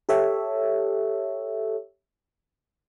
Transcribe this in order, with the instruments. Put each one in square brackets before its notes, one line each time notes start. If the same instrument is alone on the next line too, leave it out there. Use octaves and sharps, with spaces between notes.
[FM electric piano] G4 A4 C#5 E5